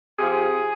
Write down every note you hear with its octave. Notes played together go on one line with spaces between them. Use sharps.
C3 F3 G#4